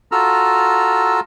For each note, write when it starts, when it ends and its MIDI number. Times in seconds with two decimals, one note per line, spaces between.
0.12 1.20 65
0.12 1.20 66
0.12 1.20 69
0.12 1.20 82
0.12 1.20 88
0.12 1.20 89